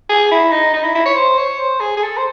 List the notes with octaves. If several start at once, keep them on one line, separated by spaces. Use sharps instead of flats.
G#4
E4
D#4
D#4
E4
E4
C#5
C5
C#5
C5
G#4
G#4
A4
C5